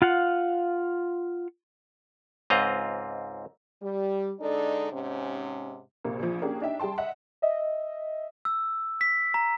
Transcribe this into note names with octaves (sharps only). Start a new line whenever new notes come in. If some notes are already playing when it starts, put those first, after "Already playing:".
F4 F5 F#5
C#2 G#2 C4 F4 D#5 A#5
G3
D3 G#3 D4 D#4 A4 D5
G#2 C3 C#4
A#1 C3 A#3
A#1 F3
A#3 C#4 D4 G4 G#4
D4 D#4 E5 G5
G3 G#4 G5 A5 C6
D#5 E5 F#5
D#5 E5
E6
B6
A#5